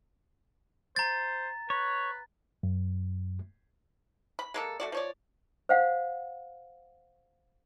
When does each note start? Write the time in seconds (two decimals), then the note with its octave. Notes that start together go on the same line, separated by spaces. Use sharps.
0.96 C5 A#5 A6
1.70 B4 C#5
2.63 F#2
4.39 B5
4.54 G#3 A#3 A4
4.80 A3 F#4 D5
4.92 F3 C#5 D5
5.69 C5 F5 F#5